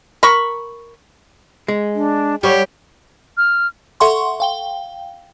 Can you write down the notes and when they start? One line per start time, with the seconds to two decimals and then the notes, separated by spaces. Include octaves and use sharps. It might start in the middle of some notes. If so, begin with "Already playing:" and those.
0.23 A#4 B5 C#6
1.68 G#3
1.95 D4
2.43 G3 G4 C#5 F#5
3.37 F6
4.00 A4 E5 F#5 C6 C#6
4.40 F5 G5 G7